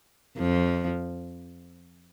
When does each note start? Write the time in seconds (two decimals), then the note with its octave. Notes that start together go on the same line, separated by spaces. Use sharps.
0.37 F2 F3